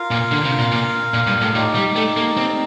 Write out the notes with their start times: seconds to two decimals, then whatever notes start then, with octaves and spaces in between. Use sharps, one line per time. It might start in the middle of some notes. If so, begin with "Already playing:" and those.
Already playing: F4 A#4 F5
0.11 A#2
0.31 D3
0.45 C3
0.59 A#2
0.72 A#2
1.14 A#2
1.27 G2
1.41 A2
1.55 A2 D#4 G4 D5
1.75 G3
1.96 A3
2.17 A#3
2.37 C4